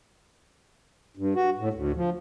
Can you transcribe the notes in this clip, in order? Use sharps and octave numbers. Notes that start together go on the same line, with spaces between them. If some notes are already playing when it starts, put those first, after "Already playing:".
G2
F#4
A2
D2
F3